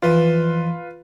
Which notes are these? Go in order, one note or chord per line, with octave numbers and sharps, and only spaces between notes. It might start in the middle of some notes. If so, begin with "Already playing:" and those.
F2 E3 F4 B4